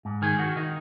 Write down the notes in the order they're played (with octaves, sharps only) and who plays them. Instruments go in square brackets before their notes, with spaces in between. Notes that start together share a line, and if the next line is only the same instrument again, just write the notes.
[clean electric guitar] G#2
D#3 G#4
D#3 F#4
D#3 D#4